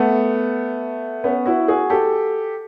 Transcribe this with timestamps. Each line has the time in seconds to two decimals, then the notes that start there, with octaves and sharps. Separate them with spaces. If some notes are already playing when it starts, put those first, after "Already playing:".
Already playing: A3 B3
1.24 B3 C#4
1.46 E4 F#4
1.68 F#4 G#4
1.90 G4 A4